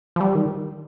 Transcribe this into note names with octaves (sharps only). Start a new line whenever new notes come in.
F3
G3
D#3